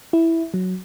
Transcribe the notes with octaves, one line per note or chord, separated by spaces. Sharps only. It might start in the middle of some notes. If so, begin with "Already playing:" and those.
E4
F#3